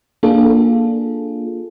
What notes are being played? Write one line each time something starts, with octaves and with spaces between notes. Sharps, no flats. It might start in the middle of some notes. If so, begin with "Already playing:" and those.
A#3 D4 F4 G#4 A4